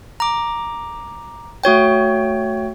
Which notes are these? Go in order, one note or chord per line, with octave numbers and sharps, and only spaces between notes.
A#5 D6
A3 F#4 C#5 G5